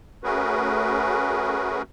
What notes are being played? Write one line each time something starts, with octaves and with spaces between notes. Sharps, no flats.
A3 C#4 F#4 G#4 A#4 B4